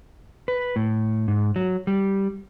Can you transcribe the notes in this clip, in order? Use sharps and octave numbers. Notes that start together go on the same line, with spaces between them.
B4
A2
G#2
F#3
G3